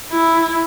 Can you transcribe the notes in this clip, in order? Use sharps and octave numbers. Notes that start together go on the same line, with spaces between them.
E4